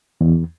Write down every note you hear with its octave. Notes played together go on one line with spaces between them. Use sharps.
E2